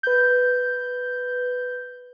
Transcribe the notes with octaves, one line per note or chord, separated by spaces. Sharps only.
B4 G6